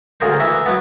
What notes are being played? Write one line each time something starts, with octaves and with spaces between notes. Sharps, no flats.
D2 C#3 G#4 A#4 C5
E3 E5 A#5
F#3 B3